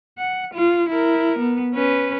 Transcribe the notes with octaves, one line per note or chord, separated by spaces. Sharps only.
F#5
F4
E4 A#4
B3
C#4 B4